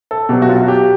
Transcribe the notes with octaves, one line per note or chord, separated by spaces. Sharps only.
A4
B2 F#3 G4
F#4
F4
F#4
G4